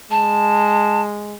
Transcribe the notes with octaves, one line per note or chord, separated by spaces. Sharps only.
G#3 A5